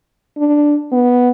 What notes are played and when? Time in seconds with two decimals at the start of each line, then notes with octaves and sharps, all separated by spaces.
0.38 D4
0.92 B3